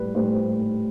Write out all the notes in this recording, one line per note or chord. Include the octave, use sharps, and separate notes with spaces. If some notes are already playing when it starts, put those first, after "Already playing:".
Already playing: A2 G3 B4
A2 G3 C5